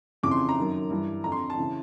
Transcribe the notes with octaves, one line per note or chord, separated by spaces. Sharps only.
F2 C#3 E3 D6
C6
A#5
F#2 D#3
G2 E3
F2 D3 A#5
C6
A5
C#3 E3